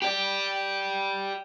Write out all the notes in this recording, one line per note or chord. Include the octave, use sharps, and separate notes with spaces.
G4 D5